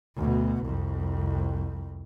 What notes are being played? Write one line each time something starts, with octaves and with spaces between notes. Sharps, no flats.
D2 B2
C2 F2